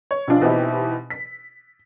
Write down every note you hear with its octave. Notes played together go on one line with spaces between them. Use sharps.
C#5
B1 F3 D4 F4
B2 E3 C4 D#4 E4 G4
B6